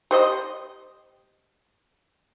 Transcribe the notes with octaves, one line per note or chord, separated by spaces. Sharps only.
G4 C5 D#5